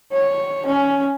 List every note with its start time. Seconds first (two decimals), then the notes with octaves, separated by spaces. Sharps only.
0.12 C#5
0.66 C#4